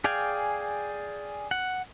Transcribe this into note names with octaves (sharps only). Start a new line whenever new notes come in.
G#4 D5 F5 G5 G#5
F#5